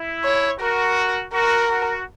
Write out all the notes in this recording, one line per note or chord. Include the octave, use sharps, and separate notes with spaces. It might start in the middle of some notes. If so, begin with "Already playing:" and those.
Already playing: E4
C#5
F#4 A#4
F#4 A#4
F#4